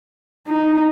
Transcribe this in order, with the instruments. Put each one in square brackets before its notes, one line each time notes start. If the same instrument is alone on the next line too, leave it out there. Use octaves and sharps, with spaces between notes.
[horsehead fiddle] D#4